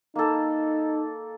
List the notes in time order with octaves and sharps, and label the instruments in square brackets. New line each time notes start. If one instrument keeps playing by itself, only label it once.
[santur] A#3 A4 [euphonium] D#4